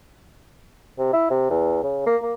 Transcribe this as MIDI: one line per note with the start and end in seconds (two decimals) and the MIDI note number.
0.98 1.08 48
1.13 1.27 64
1.30 1.48 48
1.50 1.81 40
1.83 2.03 49
2.06 2.16 58
2.22 2.33 58